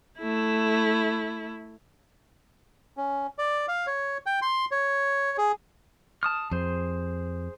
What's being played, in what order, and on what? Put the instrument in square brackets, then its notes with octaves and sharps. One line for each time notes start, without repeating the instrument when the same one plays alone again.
[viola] A3 E4
[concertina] C#4
D5
F5
C#5
G5
C6
C#5
G#4
[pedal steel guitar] A5 D#6 F6
[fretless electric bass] F2 [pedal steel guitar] G#4 C5